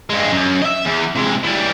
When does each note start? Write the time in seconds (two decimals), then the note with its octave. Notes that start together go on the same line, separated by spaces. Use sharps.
0.10 G2 G#3
0.32 F#2
0.62 D#5 E5
0.85 E2
1.15 C3 G#3
1.44 E3 G3